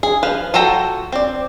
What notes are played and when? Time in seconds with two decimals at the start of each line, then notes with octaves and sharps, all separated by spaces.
0.03 G#4
0.23 F3 B4 F5
0.54 F4 F#4 A4 G5 A#5
1.12 C4 D5